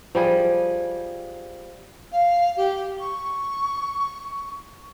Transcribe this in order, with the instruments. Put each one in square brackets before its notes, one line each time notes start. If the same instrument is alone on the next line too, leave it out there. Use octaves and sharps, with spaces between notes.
[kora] F3 G3 G#4
[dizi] F5
G4
C#6